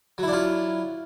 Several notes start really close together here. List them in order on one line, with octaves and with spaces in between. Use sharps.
F#3 E4 D4 F4